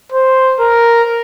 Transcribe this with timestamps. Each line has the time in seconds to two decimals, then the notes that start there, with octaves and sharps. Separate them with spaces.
0.12 C5
0.60 A#4